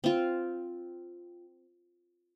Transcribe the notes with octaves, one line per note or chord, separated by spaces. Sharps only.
C4 F4